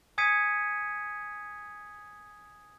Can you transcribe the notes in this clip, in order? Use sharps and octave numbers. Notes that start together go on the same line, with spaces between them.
G#5 D#6 G#6 B6 C#7 D#7